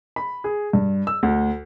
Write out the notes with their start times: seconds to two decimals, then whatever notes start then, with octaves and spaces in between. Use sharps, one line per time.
0.16 B5
0.44 G#4
0.73 G2
1.07 E6
1.23 D2